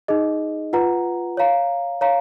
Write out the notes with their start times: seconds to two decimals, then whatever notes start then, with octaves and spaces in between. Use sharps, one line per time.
0.08 D#4 G#4 D#5
0.73 F4 B4 F#5 A#5
1.37 C#5 F5 A#5
2.01 C#5 F5 A#5